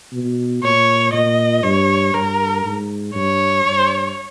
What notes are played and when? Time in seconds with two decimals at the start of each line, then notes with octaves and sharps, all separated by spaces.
0.13 B2
0.63 A#2 C#5
1.13 A#2 D#5
1.63 G2 C#5
2.14 G2 A#4
2.64 G#2
3.15 G2 C#5
3.65 G2